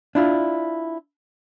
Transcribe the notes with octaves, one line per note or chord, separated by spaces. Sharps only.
D4 E4 F4